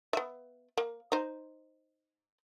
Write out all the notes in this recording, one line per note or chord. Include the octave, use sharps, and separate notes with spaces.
B3 E5
A#3
D#4 C5